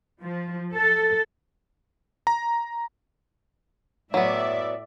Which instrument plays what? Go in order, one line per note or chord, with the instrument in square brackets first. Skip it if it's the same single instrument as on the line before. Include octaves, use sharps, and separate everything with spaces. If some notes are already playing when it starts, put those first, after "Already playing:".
[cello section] F3
A4
[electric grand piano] A#5
[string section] A2 D5 E5 [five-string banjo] F#3 B3